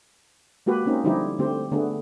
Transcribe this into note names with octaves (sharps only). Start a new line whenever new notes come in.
G#3 A#3 F#4 G4 B4
A#3 C4 C#4 D#4
D3 F3 G3 D#4 E4 G4
D3 A3 C4 G4 C5
D3 A3 B3 G#4